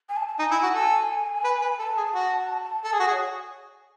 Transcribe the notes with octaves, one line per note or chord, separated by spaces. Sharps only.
G#5
A5
A5
D#4 G#5
E4
F#4
A4
B4
B4
A4 A5
G#4
F#4
A4 A5
G#4 G#5
F#4
G#5
G#4
C#5